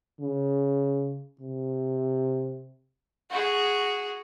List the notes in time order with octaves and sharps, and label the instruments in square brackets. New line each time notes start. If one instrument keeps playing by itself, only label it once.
[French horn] C#3
C3
[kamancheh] F#4 G#4